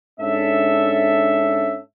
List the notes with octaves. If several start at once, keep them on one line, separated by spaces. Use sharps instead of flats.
G#2 C#4 D4 A4 E5